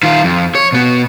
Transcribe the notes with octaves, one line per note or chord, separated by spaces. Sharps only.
D#3 F4
F2
C#5
B2 B3